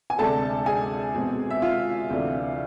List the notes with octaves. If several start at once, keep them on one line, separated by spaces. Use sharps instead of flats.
G#5
D2 C3 G#3 D4 A4 A5
G#4 G#5
E2 B2 G#3 C4
E5
F4 F5
D2 C3 E3 A3 D4